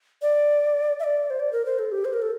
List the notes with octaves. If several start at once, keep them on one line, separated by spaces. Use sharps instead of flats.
D5
E5
D5
C5
D5
A#4
C5
A4
G4
C5
A#4
A4